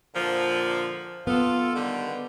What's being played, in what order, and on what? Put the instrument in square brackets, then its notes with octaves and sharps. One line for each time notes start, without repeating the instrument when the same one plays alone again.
[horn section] A#2 D3 F3
[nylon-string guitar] B3 [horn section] F4 A4
[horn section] D3 D#3 G3